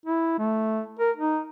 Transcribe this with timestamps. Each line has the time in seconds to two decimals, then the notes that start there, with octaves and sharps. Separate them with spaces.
0.06 E4
0.39 A3
0.99 A#4
1.17 D#4